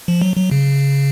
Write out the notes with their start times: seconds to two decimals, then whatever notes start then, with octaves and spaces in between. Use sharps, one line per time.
0.08 F3
0.22 F#3
0.36 F#3
0.51 C#3